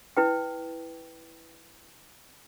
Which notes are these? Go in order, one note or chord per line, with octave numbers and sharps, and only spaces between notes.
E4 B4 G5